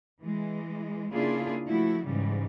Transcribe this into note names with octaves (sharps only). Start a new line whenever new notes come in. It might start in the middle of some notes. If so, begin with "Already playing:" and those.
E3 G#3
C#3 A#3 D4 E4 F4 G#4
F3 A3 E4 F#4
G#2 C#3 E3 G3